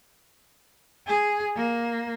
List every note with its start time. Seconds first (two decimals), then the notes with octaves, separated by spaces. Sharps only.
1.08 G#4
1.56 A#3